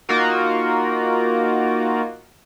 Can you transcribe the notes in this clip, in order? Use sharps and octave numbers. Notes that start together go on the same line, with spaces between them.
A#3 D#4 F4 F#4 A#4